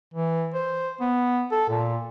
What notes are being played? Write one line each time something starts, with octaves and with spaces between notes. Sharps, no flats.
E3
C5
B3
A4
A#2